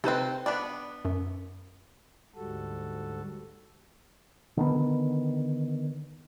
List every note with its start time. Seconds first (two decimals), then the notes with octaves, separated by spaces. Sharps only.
0.04 C3 C4 D#4 A4 B4
0.46 B3 D4 D5
1.05 F#2
2.36 D2 G#2 G3 F#4 A4
4.57 D3 D#3 B3